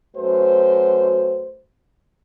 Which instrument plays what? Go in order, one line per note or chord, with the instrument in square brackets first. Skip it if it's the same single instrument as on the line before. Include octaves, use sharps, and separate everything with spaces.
[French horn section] F#2 A3 F#4 B4 C5